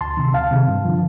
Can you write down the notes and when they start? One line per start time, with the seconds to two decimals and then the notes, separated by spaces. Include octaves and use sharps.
0.01 D2 A5 C6
0.17 C3 D#3
0.34 D2 F5 A5
0.51 C3 D#3
0.68 G2
0.85 D3 F3